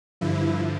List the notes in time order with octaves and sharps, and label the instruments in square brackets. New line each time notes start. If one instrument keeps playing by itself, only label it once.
[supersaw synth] G2 D3 F3 E4